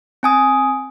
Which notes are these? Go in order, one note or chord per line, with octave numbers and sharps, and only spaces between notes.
C4 G#5 D#6